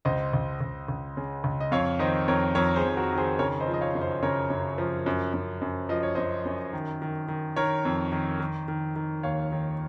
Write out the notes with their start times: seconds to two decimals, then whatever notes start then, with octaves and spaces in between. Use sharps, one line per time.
0.05 C#2 C5 D#5
0.33 C#2
0.61 C#2
0.88 C#2
1.17 C#3
1.44 C#2
1.61 D#5
1.72 F2 C#5 F5
1.99 D#3 C5 D#5
2.28 F2 A#4 C#5
2.55 F2 A#4 C#5
2.76 G#4 C5
2.83 F2
2.89 C5
2.97 F#4 A#4
3.12 D#3
3.18 G#4 C5
3.39 C#3 A#4 C#5
3.60 C5 D#5
3.68 F3
3.74 D#5
3.81 C#5 F5
3.95 F#2
4.01 C5 D#5
4.22 C#3 A#4 C#5
4.50 F#2
4.78 F3
5.06 F#2
5.34 F#2
5.61 F#2
5.89 F3 D#5
6.03 C#5
6.15 F#2 C5 D#5
6.45 F#2
6.73 D#3
7.02 D#3
7.28 D#3
7.56 D#3 A#4 C#5
7.85 F2
8.12 D#3
8.40 D#3
8.68 D#3
8.96 D#3
9.23 D#2 C#5 F5
9.52 D#3